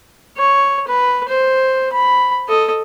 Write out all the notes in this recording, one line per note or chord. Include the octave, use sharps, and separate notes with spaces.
C#5
B4
C5
B5
A4 D#5